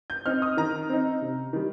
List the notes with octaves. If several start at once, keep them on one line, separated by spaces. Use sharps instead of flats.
G6
C4 D#4 F6
D#6
D#3 A#5
C4 D#4
C3
D#3 G3